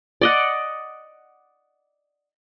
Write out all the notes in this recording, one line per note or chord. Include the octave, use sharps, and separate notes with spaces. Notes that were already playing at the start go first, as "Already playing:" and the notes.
D5 D#5 F#5